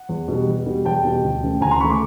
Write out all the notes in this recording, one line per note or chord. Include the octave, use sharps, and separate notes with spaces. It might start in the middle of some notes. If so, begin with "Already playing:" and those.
Already playing: F#5
E2
B2 G3
E2
B2 G3
E2 G5 A5
B2 G3
D2
C#3 E3 A3
D2 G#5 A#5
A#5 C6
C#3 E3 A3 B5 C#6
C6 D6